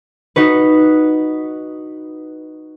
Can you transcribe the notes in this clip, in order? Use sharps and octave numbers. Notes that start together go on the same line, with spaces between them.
D#4 F#4 B4